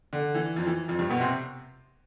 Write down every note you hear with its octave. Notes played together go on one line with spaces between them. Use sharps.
D3
E3
F2 F3
E3
F2 F3
G2 G3
B2 B3
C3 C4